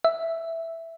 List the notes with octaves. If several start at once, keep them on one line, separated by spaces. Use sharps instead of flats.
E5